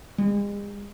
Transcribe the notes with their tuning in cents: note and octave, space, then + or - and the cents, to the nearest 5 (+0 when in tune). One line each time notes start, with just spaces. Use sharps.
G#3 -40